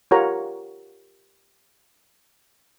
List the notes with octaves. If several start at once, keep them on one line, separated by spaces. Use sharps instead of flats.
F4 G4 A#4 C#5 F#5 A#5